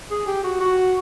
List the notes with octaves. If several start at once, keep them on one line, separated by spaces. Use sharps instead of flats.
G#4
G4
F#4
F#4